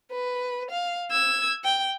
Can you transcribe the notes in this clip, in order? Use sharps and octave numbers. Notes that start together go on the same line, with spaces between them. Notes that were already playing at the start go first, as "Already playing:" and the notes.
B4
F5
E6 G#6
G5